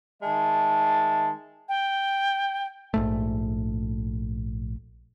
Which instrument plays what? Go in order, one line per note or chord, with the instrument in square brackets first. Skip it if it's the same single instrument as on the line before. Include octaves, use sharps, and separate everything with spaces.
[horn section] D#3 G#3 E5 A5
[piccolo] G5
[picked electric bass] A#1 G#2 A3